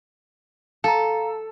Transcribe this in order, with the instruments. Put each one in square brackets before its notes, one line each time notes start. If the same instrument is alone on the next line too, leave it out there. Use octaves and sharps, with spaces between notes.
[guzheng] A4 [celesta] F5 A#5